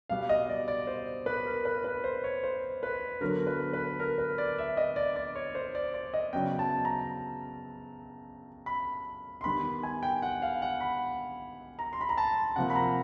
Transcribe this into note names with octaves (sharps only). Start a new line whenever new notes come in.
B2 G3 B3 F5
D#5
D5
D5
C5
B4
A#4
B4
B4
C5
C#5
C5
B4
D3 F#3 B3 A#4
B4
B4
A#4
B4
D5
E5
D#5
D5
D5
C#5
C5
D5
D5
D#5
C#3 F#3 B3 G5
A5
A#5
B5
C6
D#3 G3 B3 B5
G#5
G5
F#5
F5
F#5
B5
A#5
C6
B5
A#5
A5
C3 F3 A#3 F#5
B5
A#5